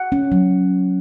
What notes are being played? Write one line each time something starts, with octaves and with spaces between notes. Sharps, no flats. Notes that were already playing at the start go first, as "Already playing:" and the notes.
Already playing: F#5
C#4
F#3